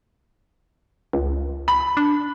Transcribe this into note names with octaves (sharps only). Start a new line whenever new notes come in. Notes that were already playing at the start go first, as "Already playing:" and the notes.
C#2
B5
D4